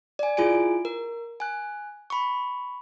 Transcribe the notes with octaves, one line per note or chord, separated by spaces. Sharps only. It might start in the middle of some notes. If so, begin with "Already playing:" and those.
D5 G#5
E4 F4 G#4 G#5 D7
A#4
G#5 F#6
B5 C#6